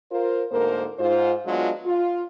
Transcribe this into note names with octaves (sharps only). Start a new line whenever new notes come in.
F4 A#4 C5
D2 G#2 A#3 A4 A#4 C5
G#2 F4 C5
F#3 G#3 B3 D4 F4
F4